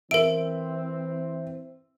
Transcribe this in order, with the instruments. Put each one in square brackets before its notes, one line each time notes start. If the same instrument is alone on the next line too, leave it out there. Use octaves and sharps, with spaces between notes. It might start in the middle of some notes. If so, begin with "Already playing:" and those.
[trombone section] E3 C4 [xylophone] A#4 D7 [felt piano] E5